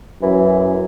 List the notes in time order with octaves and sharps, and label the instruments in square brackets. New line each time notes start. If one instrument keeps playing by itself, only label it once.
[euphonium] F#2 [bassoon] E3